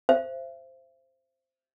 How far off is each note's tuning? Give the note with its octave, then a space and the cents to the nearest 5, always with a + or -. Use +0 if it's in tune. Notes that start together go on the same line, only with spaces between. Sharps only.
C5 +0 E5 +40